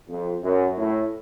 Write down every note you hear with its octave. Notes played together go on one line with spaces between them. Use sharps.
F2
F#2
A2